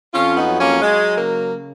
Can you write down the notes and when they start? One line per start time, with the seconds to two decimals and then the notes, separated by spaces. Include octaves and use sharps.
0.13 F2 C#4 F4
0.36 B3 D#4
0.47 F#3
0.59 A#3 C#4
0.82 F#3 G#3
1.16 C#3 A#3